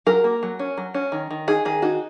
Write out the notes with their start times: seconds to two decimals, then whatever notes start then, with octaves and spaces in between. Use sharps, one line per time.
0.06 F#3 A#4
0.24 A#3
0.43 F#3
0.59 C#4
0.77 F#3
0.94 C#4
1.12 D#3
1.31 D#3
1.47 D#4 G#4
1.65 D#3 G#4
1.82 D#4 F#4